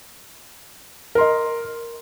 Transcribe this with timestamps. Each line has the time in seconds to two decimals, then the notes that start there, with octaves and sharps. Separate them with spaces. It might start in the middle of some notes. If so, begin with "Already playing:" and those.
1.15 A#4
1.18 C6
1.21 D#5